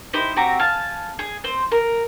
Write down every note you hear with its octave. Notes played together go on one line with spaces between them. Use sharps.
D#4 E4 G4 C5
C4 F#4 G4 A#5
F5 G#5 A5
G#4
C4 C5
A#4